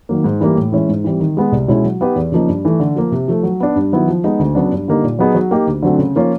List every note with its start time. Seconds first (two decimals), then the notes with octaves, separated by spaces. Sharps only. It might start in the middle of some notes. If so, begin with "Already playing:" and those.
0.09 D#3 F#3 A#3
0.24 G#2
0.40 E3 G3 A#3
0.56 A2
0.72 E3 G#3 C#4 E4
0.89 G#2
1.04 E3 G3 C4
1.20 D#3
1.37 G#3 B3
1.52 C2
1.68 B2 G#3 C#4 E4
1.84 F#3
2.01 B3 D#4 G4 B4
2.16 E2
2.32 C#3 F3 A#3 D#4
2.48 G2
2.65 E3 A3
2.80 D3
2.96 F3 A#3
3.12 C3
3.28 F3 A3
3.43 F#3
3.60 B3 D4
3.75 G2
3.92 D#3 F#3 B3 E4
4.07 F3
4.24 G#3 B3 D#4
4.39 D2
4.55 C#3 F#3 B3 D4
4.72 G2
4.88 D3 G3 A#3 D#4
5.03 A#2
5.19 F#3 B3 D#4 G#4
5.35 F#3
5.51 A#3 D#4 G4
5.67 D2
5.83 D3 F#3 A3 C4
5.99 C#3
6.16 F3 A#3 C#4 F4